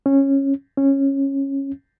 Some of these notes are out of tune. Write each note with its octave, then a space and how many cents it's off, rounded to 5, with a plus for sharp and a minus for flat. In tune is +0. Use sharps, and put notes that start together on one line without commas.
C#4 -15
C#4 -15